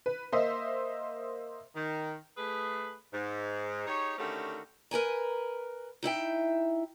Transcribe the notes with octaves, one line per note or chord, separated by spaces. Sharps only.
B4
A#3 C5 D#5 E5
D#3
A3 G#4 B4
G#2
D#4 G4 G#4 C#5
D3 D#3 A3 C#4 F#4 G4
A#4 B4 G#5 A#5
D#4 E4 E5 G5